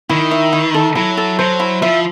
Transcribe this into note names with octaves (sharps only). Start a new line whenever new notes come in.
D#3 E4
E5
E4
A4
F#3 E4
A4
F#3 C5
E4
F3 E5